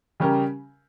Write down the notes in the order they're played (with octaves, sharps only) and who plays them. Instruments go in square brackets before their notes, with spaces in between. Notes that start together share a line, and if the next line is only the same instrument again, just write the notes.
[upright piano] C#3 G3 C#4 G4 A#4